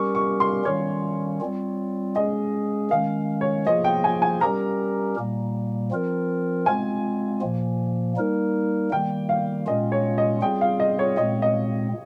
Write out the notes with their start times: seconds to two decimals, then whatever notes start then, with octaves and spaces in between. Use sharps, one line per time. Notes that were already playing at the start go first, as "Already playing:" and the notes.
Already playing: G3 C#4 G4 A#4 C#6
0.15 C#6
0.40 C6
0.65 D#3 G3 C#4 C#5
1.41 G3 C4 F4
2.15 G#3 C#4 G#4 D#5
2.91 D#3 G#3 C#4 F5
3.41 C#5
3.66 F3 A#3 F4 G#4 D#5
3.84 G5
4.04 G#5
4.22 G#5
4.41 G3 C#4 G4 A#4 A#5
5.16 A#2 G3 A#3
5.91 F3 C4 F4 A#4
6.66 G#3 C4 F4 G#5
7.41 A#2 F3 A#3
8.16 G3 A#3 D#4 A#4
8.91 D#3 G3 A#3 G5
9.29 F5
9.67 A#2 G#3 C#4 F4 D#5
9.92 C#5
10.18 D#5
10.42 G3 C4 F4 G#4 G5
10.61 F5
10.80 D#5
10.99 C#5
11.17 A#2 G#3 C4 D#5
11.42 D#5